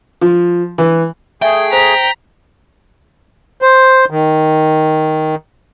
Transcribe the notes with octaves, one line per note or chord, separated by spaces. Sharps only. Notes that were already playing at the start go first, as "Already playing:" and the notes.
F3
E3
A3 G#4 E5 G5
C5 A#5 B6
C5
D#3